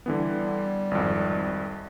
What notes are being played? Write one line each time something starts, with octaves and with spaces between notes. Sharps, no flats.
D3 E3 G3 B3
G#1 F2